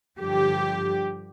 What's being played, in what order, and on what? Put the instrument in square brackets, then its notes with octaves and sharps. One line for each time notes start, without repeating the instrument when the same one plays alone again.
[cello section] G2 D3 F3 G4